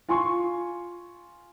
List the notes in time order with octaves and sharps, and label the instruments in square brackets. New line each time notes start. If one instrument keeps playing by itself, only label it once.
[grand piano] F4 G#5 C6 C#6